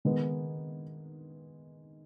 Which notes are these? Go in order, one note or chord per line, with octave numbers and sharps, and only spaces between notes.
D#3 G#3 B3